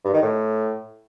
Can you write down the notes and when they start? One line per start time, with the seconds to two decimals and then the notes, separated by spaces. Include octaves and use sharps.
0.05 G2
0.13 D#3
0.22 A2